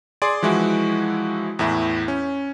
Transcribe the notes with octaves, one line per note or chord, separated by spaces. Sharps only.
G#4 D5 C6 D7
E3 F3 G#3 E4 F#4
E2 A2 E4
C#4